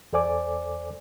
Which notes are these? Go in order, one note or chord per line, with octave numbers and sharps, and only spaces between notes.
E2 A4 C5 D5 G#5 D6